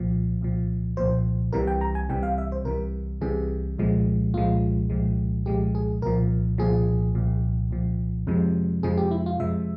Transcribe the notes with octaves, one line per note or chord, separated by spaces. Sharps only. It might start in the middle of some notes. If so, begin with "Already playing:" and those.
Already playing: C2 A#2 F3
C2 A#2 F3
C2 A#2 F3 C5
C2 C3 E3 G3 A#4
G5
A#5
G#5
C2 C3 E3 G3 G5
F5
E5
C5
C2 C3 E3 G3 A#4
C2 C3 E3 G3 G#4
C2 A#2 F3 G#3
C2 A#2 F3 G#3 F4
C2 A#2 F3 G#3
C2 A#2 F3 G#3 G4
G#4
C2 A#2 F3 A#4
C2 A#2 F3 G#4
C2 A#2 F3
C2 A#2 F3
F2 C3 F3 G#3
F2 C3 F3 G#3 G#4
G4
E4
F4
F2 C3 F3 G#3 E5